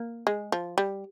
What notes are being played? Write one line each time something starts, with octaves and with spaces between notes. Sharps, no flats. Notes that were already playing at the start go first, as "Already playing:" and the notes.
Already playing: A#3
G#3
F3
G3